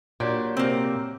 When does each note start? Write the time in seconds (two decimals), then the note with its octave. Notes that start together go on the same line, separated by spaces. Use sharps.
0.20 A#2 F#3 D4 G4
0.57 C3 A#3 C4